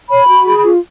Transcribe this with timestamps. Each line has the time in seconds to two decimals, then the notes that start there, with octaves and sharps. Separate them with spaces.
0.09 C#5 B5
0.28 F#4
0.46 G#4
0.64 F4